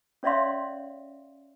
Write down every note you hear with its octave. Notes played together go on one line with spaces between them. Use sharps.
C#4 C#5 D5 E5 F5 C6